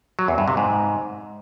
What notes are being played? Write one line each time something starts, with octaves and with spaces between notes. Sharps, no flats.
F#3
E2
G2
C3
G#2